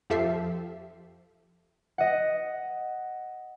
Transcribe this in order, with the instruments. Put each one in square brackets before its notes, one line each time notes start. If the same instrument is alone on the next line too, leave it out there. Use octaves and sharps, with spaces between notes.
[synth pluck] F2 F3 G4 A4 E5 C7
[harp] D#5 F#5